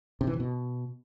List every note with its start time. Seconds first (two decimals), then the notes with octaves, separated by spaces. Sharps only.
0.21 C3
0.27 E3
0.33 C3
0.40 B2